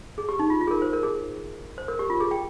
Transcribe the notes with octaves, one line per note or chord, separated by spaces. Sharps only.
G#4
G4
D#4
F4
F4
G#4
A#4
C5
A#4
G#4
C5
A#4
G4
F4
G#4
G5